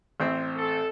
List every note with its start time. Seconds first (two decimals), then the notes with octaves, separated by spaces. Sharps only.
0.20 A1 C4 E5
0.57 A4